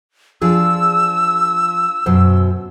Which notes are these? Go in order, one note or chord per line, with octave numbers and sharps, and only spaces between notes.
F3 D4 G#4 E6
F#2 B2 C5